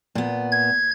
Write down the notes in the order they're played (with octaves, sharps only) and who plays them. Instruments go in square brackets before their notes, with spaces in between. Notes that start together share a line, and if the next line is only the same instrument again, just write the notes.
[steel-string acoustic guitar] A#2 B3
[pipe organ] G#6